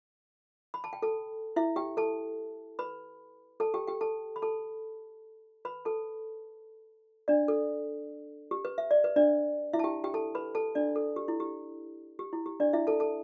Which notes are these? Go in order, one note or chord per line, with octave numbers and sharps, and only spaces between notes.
B5
A5
G5
A4 A5
E4 E5
G4 G5
A4 A5
B4 B5
A4 A5
G4 G5
G4 G5
A4 A5
B5
A4 A5
B4 B5
A4 A5
D4 D5
A4
G4
B4
E5
D5
B4
D4 D5
E4 E5
A5
G4 G5
G4 G5
A4 A5
B4 B5
A4 A5
D4 D5
A4
G4
E4
G4
G4
E4
G4
D4 D5
E4 E5
A4 A5
A4 A5